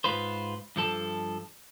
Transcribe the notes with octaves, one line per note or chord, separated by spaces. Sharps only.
G#2 F4 B4 C5
G2 F3 A4 A5